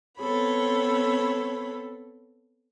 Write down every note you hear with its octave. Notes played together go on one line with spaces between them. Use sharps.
B3 C4 A4 C#5 B5